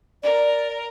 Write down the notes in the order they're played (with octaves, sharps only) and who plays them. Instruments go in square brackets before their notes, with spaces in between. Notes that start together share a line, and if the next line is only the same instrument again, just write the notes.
[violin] A#4 [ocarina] D5